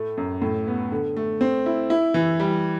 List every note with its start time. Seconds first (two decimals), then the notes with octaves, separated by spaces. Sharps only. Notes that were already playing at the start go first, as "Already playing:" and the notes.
Already playing: A2 A3
0.18 F#2
0.42 A2
0.67 B3
0.92 D3
1.17 A3
1.41 C4
1.66 E4
1.90 E4
2.14 E3
2.40 G3